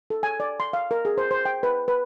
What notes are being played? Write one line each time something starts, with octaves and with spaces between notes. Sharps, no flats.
A4
G#5
D5
C6
F5
A#4
G#4
C5
C5
G5
B4
B4